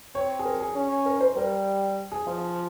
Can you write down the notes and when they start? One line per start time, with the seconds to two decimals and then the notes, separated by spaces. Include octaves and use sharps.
0.15 C4 C#5
0.39 G#4
0.45 A#4
0.60 G#4
0.75 C#4
1.06 A#4
1.21 C5
1.36 G3 A#4
2.12 G#4
2.27 F3 F4